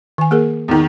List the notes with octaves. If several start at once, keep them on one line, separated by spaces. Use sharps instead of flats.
D#3 G#5
A#3 G#4 A#4
E2 D#3